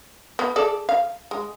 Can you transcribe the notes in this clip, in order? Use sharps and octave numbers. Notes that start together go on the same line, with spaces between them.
B3
G#4 A4 D5
F5
G#3